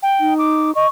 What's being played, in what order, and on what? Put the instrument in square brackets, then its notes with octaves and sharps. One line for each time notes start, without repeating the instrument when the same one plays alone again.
[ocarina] G5
[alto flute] D#4
[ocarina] D6
[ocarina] D#5 [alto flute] C#6